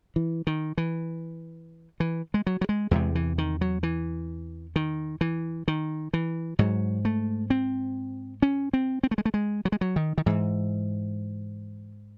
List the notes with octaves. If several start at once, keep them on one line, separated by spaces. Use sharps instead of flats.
E3
D#3
E3
E3
G#3
F#3
F#3
G#3
E2 C3 G#3
E3
D#3
F#3
E3
D#3
E3
D#3
E3
G#2 F#3
A3
C4
C#4
C4
C4
A3
G#3
A3
G#3
F#3
G#3
F#3
D#3
D#3
G#2 E3